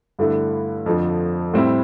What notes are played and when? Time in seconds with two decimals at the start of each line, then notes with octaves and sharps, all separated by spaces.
0.19 G2 D3 A3 E4
0.86 F2 D3 F3
1.54 A2 G3 C4 E4